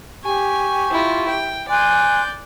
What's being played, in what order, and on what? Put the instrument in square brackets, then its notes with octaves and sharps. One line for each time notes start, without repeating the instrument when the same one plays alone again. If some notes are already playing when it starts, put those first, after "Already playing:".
[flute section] G4 C#6 [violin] G#5
[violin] E4 F4
G5
[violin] D5 G6 [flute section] G#5 C6 F#6